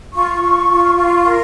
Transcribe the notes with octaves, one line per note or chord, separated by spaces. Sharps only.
F4 C#6
F4
F4
F4
A#4